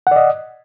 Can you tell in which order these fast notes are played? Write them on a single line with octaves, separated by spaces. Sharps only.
F#5 D5 D#5